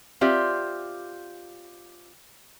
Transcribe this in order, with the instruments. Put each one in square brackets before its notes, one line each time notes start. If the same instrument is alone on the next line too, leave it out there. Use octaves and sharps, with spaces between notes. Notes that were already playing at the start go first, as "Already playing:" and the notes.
[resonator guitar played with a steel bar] C4 F4 G4 D5 E5